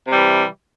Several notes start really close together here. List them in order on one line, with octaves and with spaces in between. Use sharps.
C3 G3 E3